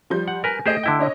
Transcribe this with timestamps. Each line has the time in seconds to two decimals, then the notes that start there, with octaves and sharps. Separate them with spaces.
0.10 F3 G3 G6
0.28 F#5
0.44 A#4 B4 G#5
0.66 A3 G4 G#4 C5 D#5 D7
0.84 D3 E4 G5
0.99 D4 C#5 D#5